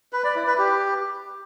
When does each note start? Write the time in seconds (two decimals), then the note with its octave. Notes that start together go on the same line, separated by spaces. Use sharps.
0.13 B4
0.24 D5
0.35 E4
0.47 B4
0.58 G4